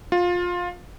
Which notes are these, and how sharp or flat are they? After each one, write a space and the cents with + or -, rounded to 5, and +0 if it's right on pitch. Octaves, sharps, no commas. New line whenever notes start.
F4 +20